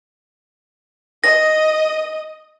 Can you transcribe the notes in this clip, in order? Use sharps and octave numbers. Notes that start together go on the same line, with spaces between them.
D#5 D#6 A#6